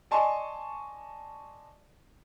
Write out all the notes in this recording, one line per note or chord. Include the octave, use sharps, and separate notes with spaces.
D5 D#5 G#5 A5 C6 C#6